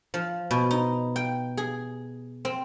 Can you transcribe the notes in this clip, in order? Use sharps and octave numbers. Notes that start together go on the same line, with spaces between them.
F3
B2
D#4
G5
G#4
C4